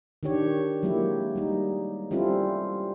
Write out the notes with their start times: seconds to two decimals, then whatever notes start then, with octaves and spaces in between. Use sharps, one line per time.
0.23 D#3 D4 G4 C#5
0.83 F#3 G#3 A#3 E4 G4
1.35 G3 D#4
2.11 G3 C4 C#4 E4 F4 A4